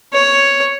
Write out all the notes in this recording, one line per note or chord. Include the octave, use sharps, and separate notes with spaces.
C#5